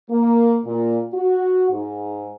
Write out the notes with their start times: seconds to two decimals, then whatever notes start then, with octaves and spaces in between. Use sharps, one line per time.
0.10 A#3
0.65 A#2
1.14 F#4
1.71 G#2